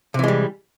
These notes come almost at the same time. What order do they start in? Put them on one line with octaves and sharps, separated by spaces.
C3 E3 G#3 G3